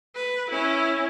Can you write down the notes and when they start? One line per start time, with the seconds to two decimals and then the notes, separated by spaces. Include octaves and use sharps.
0.15 B4
0.50 C#4 E4